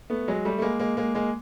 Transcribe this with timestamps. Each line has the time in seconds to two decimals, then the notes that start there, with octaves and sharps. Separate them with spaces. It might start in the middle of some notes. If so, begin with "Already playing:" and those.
0.10 A3 B3
0.28 F#3 G#3
0.45 G3 A3
0.58 A3
0.62 G#3 A#3
0.79 G#3 A#3
0.97 G#3 A#3
1.15 G#3 A#3